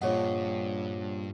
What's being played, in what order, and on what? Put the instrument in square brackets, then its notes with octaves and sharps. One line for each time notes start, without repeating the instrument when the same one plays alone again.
[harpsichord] A#1 D#5 [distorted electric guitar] G2 [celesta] C#5 F#5